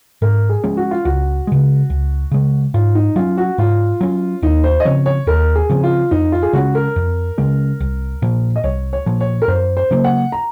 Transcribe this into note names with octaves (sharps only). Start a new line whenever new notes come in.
G#2 A#4
G#4
F3 G#3 C#4
F#4
F4
C#2 F#4
C#3 G#3
C#2
C#3 G#3
G#2 F4
D#4
F#3 C#4 F4
F#4
G#2 F4
F#3 C#4
D#2 D#4
C5
D#5
C#3 F3 C4 C#5
C#5
D#2 A#4
G#4
C#3 F3 C4
F4
F2 D#4
F4
G#4
C#3 G#3 C#4 F#4
A#4
F2
C#3 G#3 C#4
C2
A#2 F3
D#5
C2 C#5
C#5
A#2 F3
C#5
A#4
F#2 C5
C5
C#3 F#3 A#3
F#5
A#5